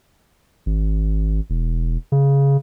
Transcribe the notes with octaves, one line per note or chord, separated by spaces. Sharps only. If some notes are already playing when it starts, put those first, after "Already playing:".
G#1
E1
C#3